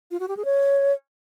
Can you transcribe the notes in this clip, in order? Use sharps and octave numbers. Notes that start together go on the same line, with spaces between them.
F4
F#4
G4
G#4
C#5